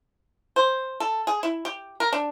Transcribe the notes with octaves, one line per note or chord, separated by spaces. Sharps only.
C5
A4
G#4
E4
G4
A#4
D4